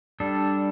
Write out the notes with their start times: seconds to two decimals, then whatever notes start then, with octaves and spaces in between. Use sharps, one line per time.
0.20 G3 D4 A4